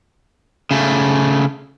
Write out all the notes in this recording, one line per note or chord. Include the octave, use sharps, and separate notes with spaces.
C#3 A3